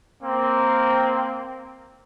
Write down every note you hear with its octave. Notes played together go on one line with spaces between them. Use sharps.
A#3 C4